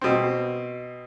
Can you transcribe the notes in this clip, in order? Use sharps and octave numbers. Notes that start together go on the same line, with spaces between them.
B2 C4